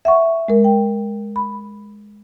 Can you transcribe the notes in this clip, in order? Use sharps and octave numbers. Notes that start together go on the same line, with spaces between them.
E5 F#5 C#6
G#3 A#4
G5
B5